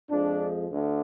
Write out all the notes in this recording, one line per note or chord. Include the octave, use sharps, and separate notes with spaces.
F2 F3 G#3 D4
D2 D3